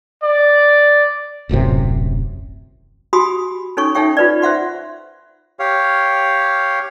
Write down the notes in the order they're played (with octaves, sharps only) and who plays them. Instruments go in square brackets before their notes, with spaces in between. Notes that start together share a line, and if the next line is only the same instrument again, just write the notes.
[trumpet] D5
[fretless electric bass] D#1 A1 F#2 C3
[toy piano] F#4 G4 G#5 B5 C6 D#6
C#4 D#4 A4 C#5 G#5 C#6
D#4 A4 C#5 E5 G5 C#6
F4 B4 D5
C5 E5 F#5 C6
[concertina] G4 C#5 F5